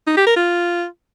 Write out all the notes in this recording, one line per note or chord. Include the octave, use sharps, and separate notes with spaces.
D#4
G4
A#4
F4